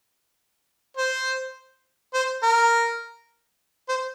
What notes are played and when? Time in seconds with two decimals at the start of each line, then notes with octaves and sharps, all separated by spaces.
0.97 C5
2.14 C5
2.43 A#4
3.89 C5